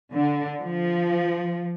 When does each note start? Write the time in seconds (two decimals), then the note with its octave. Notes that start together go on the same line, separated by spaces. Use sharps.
0.13 D3
0.61 F3